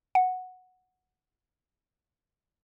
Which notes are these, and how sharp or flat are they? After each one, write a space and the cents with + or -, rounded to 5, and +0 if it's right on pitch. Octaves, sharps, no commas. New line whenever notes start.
F#5 -5